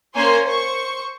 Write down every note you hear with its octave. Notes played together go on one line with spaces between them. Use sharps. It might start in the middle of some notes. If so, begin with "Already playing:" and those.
A#3 C#4 C5 C#5 G#5 C6
C5 C#6